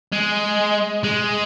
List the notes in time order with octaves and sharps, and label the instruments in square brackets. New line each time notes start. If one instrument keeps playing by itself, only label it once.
[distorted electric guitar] G#3
G#3